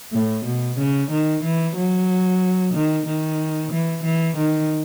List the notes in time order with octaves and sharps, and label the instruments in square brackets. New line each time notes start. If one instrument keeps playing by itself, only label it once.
[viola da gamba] A2
B2
C#3
D#3
E3
F#3
D#3
D#3
E3
E3
D#3